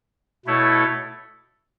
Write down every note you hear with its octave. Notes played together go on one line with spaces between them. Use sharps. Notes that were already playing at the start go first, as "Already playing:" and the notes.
B2 A3 E4 A4 C#5